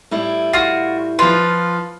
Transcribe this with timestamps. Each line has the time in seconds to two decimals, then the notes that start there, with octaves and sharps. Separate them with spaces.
0.11 A2 G3 E4
0.53 F4 F#4 C7
1.19 F3 F4 B4